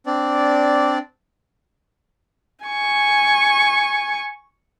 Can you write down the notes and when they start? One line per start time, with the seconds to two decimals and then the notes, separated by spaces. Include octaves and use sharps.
0.06 C4 D4 D5
2.66 G#5 C#6